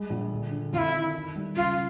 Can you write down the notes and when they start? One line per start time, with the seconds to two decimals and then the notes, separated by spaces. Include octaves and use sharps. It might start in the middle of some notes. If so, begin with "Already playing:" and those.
Already playing: G3 G#3
0.10 A#1
0.31 D3
0.51 D3
0.73 F2 F4
0.78 E4
0.94 D#3
1.14 D#3
1.36 G3
1.56 C#2 F4